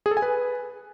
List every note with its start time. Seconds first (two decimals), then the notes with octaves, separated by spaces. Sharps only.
0.06 G#4
0.11 A4
0.17 G#5
0.22 B4